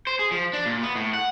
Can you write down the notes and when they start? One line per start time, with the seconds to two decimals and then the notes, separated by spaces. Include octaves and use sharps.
0.07 C5
0.19 G#4
0.31 F3
0.53 D4
0.66 A#2
0.83 B3
0.95 A2
1.14 F#5